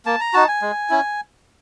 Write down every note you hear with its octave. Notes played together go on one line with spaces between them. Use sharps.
A#3 A5
A#5
D#4 F#4 A5
G#5
G#3
C#4 E4